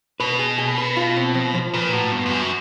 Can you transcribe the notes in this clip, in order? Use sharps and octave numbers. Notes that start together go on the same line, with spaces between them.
B2 B4
G#4
G#4
B4
F4
C4
F3
F3
A#2 B4
A2 F#4
G2 B3
F2
F#2 F#4